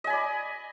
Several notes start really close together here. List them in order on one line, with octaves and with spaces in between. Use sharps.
D#5 G#5 B5 D5